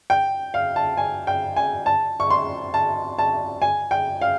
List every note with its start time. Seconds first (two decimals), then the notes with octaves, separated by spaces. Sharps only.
0.10 G5
0.54 F5
0.76 A5
0.97 G#5
1.27 G5
1.56 G#5
1.86 A5
2.20 C#6
2.30 C6
2.74 A5
3.18 A5
3.62 G#5
3.91 G5
4.22 F5